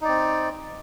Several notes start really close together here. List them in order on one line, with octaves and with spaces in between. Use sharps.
D#4 D5 C4